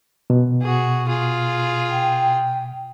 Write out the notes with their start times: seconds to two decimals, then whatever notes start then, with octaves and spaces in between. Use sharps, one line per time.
0.30 B2
0.62 F#4 G#4
1.08 F4 G#4
1.90 G5